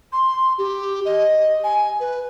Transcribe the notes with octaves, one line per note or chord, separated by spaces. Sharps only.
C6
G4
D#5
G#5
B4